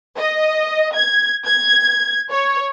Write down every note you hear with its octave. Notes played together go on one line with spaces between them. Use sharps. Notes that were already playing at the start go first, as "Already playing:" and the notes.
D#5
G#6
G#6
C#5